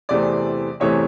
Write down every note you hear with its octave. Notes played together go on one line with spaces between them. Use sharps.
E2 C3 E3 A3 C4 D5
E2 C3 E3 A3 C4 C#5